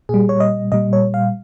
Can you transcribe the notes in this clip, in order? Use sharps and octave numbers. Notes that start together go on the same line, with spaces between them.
A#2 G3 G#4
C#5
D#5
A#2 G3 D#5
C#5
F5